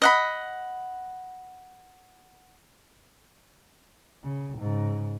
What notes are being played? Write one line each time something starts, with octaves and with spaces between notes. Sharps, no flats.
D#5 F#5 B5
C#3
G#2 C#3